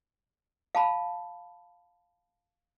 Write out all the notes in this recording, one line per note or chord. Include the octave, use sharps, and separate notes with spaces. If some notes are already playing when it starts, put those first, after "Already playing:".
F5 A5 B5